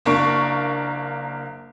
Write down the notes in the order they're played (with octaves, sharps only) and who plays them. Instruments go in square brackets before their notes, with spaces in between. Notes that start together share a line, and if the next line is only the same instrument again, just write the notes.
[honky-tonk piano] F#1 A#3 D4 C#6 D7